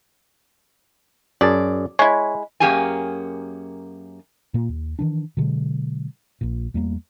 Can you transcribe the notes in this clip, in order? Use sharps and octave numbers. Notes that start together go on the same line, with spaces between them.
F#2 G#4 D5 A5
G#3 E4 C#5
F#2 A#3 C#4 G4 G#4 G#5
A#2 A#3
D#2
D#3 E3 D4
B2 D3 F#3 G#3
A#1 A#2
E2 G3 A3 A#3